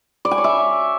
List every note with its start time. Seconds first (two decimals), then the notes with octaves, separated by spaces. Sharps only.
0.25 D5
0.31 G#5
0.38 C#5
0.44 E5